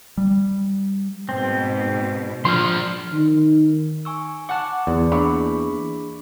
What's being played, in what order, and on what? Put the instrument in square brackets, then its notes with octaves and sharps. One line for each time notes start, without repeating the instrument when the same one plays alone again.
[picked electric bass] G3
[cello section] G#2 B2 [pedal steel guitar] C4
[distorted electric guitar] F3 D4 [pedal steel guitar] C6 F6
[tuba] D#3
[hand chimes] G#5 C#6 E6
[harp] F#5 A5 [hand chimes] D6 F#6
[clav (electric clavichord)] E2 [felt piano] D5
[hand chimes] A#3 D4 G#4 [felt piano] B5 C#6 D6